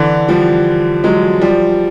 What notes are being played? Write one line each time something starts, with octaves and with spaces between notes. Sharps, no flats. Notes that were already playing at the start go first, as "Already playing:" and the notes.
Already playing: D3 E3
F3 G3
F#3 G#3
F3 G3